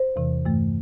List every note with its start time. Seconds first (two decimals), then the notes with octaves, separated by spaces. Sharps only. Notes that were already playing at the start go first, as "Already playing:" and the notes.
Already playing: C5
0.16 E2 C3 E3
0.46 G2 E3 A3